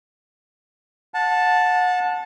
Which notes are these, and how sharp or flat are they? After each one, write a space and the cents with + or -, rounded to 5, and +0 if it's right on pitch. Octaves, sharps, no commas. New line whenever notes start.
F#5 -30 A5 +0